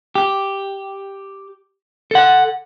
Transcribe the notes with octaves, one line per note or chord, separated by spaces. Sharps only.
G4
A4 F#5